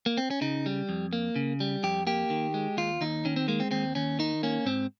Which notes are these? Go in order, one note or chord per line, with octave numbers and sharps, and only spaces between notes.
A#3
C4
C#4
C#3 D#4
G3
F2
A#3
C#3
G3
F2 G4
A#3 G4
D#3
G#3
D#2 F4
D#2 D#4
D#3 C#4
C4
G#3 A#3
C4
D#2 C4
D#2 C#4
D#3 D#4
A#3 C#4
G#2 C4